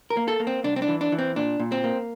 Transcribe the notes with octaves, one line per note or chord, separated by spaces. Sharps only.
A#4
A#3
A4
A#3
C4
C2 D4
C4
D4
E3
D4
E3
C4
A#2 D4
A#2
C4
A#3